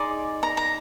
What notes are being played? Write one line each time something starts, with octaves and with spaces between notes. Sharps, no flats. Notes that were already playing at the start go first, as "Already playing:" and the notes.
Already playing: D#4 G#4 D5 C6
A#5
A#5